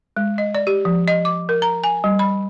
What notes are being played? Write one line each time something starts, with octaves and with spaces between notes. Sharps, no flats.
G#3
D#5
D5
G4
F3
D#5
D6
A#4
A#5
G#5
G3
B5